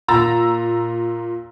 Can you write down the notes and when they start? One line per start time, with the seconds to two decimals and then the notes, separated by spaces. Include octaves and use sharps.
0.08 A#2 A#5 E6 A6